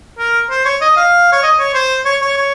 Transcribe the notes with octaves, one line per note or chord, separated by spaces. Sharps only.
A#4
C5
C#5
D#5
F5
C#5
D#5
C#5
C5
C#5
C#5
C#5